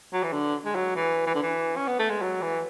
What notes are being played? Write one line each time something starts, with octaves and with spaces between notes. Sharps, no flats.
F#3
E3
D3
G#3
F#3
E3
E3
D3
E3
C#4
B3
A3
G#3
F#3
E3